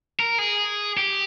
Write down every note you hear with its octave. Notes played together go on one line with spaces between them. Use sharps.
A#4
G#4
G4